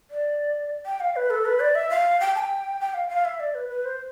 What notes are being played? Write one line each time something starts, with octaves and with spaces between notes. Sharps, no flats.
D5
G5
F5
B4
A4
B4
D5
E5
F5
G5
A5
G5
G5
F5
F5
E5
D5
B4
B4
C5